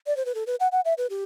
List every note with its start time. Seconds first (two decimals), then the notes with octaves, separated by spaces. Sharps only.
0.07 D5
0.17 C5
0.26 B4
0.35 A4
0.47 B4
0.60 F#5
0.72 F#5
0.85 E5
0.98 B4
1.10 G4